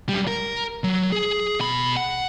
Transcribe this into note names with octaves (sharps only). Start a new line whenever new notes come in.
F#2 G3
A#4
F#3
G#4
B2 B5
F#5